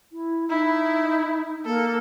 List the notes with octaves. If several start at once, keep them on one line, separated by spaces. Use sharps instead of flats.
E4
D#4 E4
A#3 A4